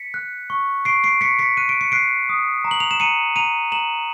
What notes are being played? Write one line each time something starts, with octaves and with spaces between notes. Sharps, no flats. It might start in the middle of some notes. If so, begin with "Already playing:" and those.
Already playing: B6 C#7
F#6
C#6
C#6 C7 D7
C7 D7
C#6 B6 C#7
B6 C#7
F#6 D#7
D7
C#7
F#6 C7 D7
D#6
A#5
F#7
F7
E7
A#5 C#7 D#7
A#5 D#7 F7
A#5 E7 F#7